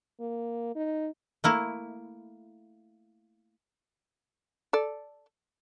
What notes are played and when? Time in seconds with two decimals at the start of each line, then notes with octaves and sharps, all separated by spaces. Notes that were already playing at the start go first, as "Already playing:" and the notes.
0.20 A#3
0.75 D#4
1.44 A3 A#3 E4
4.73 A4 D5